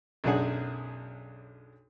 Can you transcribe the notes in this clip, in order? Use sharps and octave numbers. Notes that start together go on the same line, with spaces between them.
B1 F#2 D4 G#4 F#5